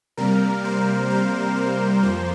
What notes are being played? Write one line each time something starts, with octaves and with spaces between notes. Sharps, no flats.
C3 G3 A#3 A#4
C5
C5
A#4
F2 F3 A#3 C5